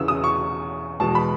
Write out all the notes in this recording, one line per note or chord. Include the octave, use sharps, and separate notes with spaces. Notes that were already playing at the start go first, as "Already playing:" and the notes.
Already playing: E2 C#3 E3 E6
D#6
C#6
E2 B2 G#3 A5
B5